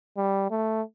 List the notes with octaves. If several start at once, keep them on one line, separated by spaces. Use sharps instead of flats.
G3
A3